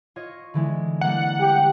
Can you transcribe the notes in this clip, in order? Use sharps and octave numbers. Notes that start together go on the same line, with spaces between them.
F4 C#5 D#5
D3 E3 G#3
G3 A#3 F#5
G4